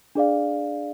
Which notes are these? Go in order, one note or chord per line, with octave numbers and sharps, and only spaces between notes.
D4 G#4 D5 F5